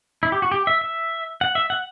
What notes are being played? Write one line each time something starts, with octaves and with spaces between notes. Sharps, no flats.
E4
G4
F#4
G4
E5
E5
F#5
E5
F#5